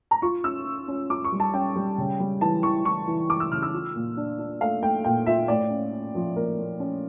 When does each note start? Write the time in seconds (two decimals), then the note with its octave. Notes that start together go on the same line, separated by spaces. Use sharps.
0.11 A#5
0.22 F4 C#6
0.44 C#4 E6
0.65 C#4
0.88 C#4
1.10 F4 D6
1.25 C#6
1.32 G3
1.40 A5
1.54 C#4 G5
1.76 G3
1.98 C#3
2.20 G3
2.41 E3 A5
2.63 E3 C#6
2.85 E3 C#6
3.08 E3
3.29 E3 D6
3.40 E6
3.51 C#3 F6
3.62 E6
3.73 F4
3.95 A#2
4.17 D4
4.39 D4
4.61 A3 F5
4.83 A3 G5
5.04 A#2 G5
5.26 F4 E5
5.48 A2 D5
5.70 C#4
5.93 C#4
6.15 F3
6.36 A#3 A#4
6.58 A#3
6.80 C#4